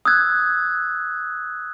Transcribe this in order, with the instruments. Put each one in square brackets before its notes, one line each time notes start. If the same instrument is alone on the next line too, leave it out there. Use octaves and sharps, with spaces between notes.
[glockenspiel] D#6 E6 F#6 G#6